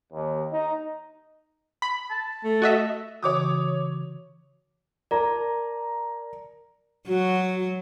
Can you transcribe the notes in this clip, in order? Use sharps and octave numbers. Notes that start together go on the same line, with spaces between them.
D#2
D#4
B5
A5
A3
F#4 D#5 E5
C#3 E3 F#4 C#5 D6 D#6
A#4 D5 A5 A#5
F#3 F#4